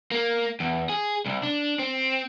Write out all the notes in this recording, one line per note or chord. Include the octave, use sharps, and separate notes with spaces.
A#3
E2
G#4
C2
D4
C4